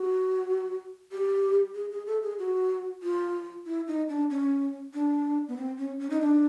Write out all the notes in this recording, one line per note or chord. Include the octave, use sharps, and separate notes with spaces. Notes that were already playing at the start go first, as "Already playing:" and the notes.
Already playing: F#4
G4
G#4
G#4
A4
G#4
F#4
F4
E4
D#4
D4
C#4
D4
B3
C4
C#4
C#4
D#4
D4